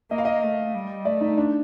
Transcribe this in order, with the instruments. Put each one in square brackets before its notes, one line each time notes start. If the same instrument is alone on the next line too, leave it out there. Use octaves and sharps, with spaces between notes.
[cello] A#3 [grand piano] D#5
[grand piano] F5
D#5
[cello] A3
G3
[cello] A3 [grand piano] D5
[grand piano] D#4
D4